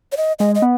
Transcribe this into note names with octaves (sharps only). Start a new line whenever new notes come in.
C#5
D#5
G#3 D#5
D#5
B3